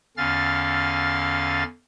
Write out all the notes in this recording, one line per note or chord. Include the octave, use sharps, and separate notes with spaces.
E2 D3 C#4 F5 F6 A6